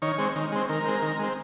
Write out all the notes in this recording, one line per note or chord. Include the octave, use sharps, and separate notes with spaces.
D#3 C#5
G#3 C4
D#3
G#3 C4
D#3 A#4
G#3 C4
D#3
G#3 C4